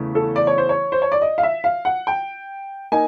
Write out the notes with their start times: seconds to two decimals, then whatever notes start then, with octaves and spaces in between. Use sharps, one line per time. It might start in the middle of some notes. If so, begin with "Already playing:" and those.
Already playing: E2 C#3 E3 A3
0.15 A4
0.36 D5
0.47 C#5
0.58 C5
0.69 C#5
0.92 C5
1.02 C#5
1.12 D5
1.22 D#5
1.38 F5
1.43 E5
1.64 F5
1.85 F#5
2.07 G5
2.92 A#3 D#4 G#5